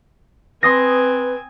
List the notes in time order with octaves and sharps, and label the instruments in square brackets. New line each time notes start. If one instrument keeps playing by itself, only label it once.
[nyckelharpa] C4 G#5 [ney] B4 [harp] C6 D#6 A#6